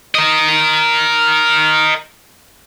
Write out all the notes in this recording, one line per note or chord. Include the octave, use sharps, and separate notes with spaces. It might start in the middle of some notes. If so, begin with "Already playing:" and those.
A#4 D#5